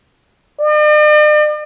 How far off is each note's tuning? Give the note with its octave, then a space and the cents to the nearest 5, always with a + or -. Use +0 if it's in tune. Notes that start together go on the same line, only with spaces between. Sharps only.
D5 +45